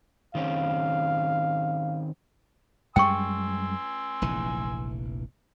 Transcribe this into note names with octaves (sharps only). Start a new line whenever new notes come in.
D#3 C4 C#4 F5
F#2 G3 G#3 G5 G#5 C6 C#6 E6
F1 A#1 E3